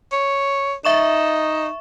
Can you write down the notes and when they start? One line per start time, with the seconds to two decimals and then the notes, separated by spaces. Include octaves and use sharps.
0.12 C#5
0.85 D#4 E5 C#6 E7